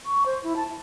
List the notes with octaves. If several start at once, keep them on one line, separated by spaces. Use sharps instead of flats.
C#6
C5
E4
A5